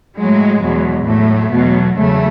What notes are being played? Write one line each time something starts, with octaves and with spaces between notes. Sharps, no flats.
A2 F#3 G#3
E2 B2 F#3
A2 F#3 A3
E2 B2 F#3
E2 C#3 F#3 A3